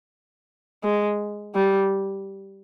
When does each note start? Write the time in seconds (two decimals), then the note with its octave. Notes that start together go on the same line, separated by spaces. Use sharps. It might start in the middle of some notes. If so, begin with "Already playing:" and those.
0.83 G#3
1.55 G3